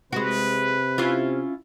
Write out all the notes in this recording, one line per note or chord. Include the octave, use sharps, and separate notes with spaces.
C3 G#3 F#4 B4
C#4 E4 F4